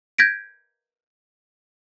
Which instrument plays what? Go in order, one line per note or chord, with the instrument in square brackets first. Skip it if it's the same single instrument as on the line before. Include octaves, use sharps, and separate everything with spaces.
[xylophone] G6 G#6 A#6 B6 D7